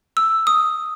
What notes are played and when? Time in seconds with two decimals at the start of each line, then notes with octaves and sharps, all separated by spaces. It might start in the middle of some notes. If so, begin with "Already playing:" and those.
0.17 E6
0.47 D#6